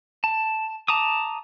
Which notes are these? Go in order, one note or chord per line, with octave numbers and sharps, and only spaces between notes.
A5
A5 A#5 D6 D#6